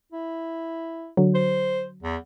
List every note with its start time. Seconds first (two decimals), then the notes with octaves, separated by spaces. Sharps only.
0.12 E4
1.17 D3 F#3
1.35 C5
2.03 E2